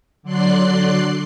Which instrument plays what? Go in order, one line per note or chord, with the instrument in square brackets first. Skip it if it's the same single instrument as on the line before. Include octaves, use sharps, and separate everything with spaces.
[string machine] D3 F#3 D5 C6 F#6 C7